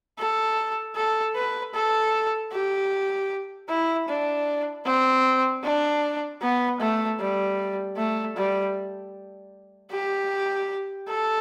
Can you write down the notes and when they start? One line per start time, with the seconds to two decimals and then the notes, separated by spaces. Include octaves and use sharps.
0.18 A4
0.96 A4
1.35 B4
1.74 A4
2.52 G4
3.69 E4
4.08 D4
4.85 C4
5.64 D4
6.42 B3
6.80 A3
7.20 G3
7.97 A3
8.36 G3
9.92 G4
11.09 A4